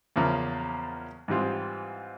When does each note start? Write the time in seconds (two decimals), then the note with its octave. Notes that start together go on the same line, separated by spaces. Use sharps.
0.16 E2 C#3 F3 A#3
1.28 G#2 E3 G3 C4 F4